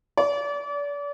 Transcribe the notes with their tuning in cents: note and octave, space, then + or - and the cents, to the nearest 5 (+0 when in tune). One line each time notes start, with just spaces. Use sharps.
D5 -35